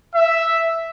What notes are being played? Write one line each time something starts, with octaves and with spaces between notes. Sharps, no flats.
E5